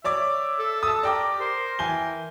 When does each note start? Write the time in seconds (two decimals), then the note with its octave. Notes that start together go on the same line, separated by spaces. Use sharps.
0.04 C#5 D5 E5 D6
0.59 A4
0.83 A5 D#6
1.03 G4 A#4 D5 G5 D6
1.40 A#4 C5
1.79 E3 G5 G#5 G7